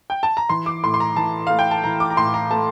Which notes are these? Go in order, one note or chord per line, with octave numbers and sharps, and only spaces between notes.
G5
A5
A#5
E3 C6
D6
A2 C6
C6
A#5
E3 A5
A3 F5
G5
A5
E3 A#5
D6
A#5
A2 C6
A#5
A3 A5